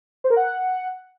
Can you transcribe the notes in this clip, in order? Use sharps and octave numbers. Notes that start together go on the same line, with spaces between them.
C5
A#4
F#5